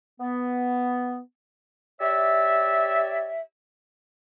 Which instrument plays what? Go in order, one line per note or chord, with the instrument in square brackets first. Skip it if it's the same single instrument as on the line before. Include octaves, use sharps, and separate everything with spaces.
[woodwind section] B3
G4 C#5 D5 E5